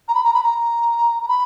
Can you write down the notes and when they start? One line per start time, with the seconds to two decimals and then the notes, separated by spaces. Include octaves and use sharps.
0.08 A#5
0.14 B5
0.24 A#5
0.34 B5
0.43 A#5
1.23 A#5
1.28 B5